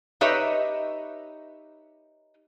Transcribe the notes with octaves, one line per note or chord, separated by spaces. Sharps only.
D#4 G4 B4 C#5 D#5 E5